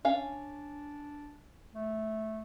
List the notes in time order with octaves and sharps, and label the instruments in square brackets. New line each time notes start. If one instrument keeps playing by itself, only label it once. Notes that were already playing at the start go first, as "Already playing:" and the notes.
[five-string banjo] C#4 F5 [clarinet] D4
[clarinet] A3